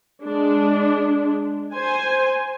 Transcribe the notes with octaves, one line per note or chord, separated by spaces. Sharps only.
G#3 D4
C5 G#5